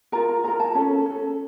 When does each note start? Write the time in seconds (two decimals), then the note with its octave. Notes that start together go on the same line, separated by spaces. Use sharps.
0.12 F4 A#4 A#5
0.43 F4 A#5
0.48 A#4
0.60 A5
0.75 C#4 A4
1.06 C#4 A4